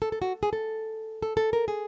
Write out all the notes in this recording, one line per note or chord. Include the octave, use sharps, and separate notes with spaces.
A4
A4
F#4
G#4
A4
A4
A4
A#4
G#4